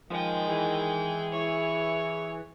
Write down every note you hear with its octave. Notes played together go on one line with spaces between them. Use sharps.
D#3 F3 G#3 G5
E3 G#4
E4 C#5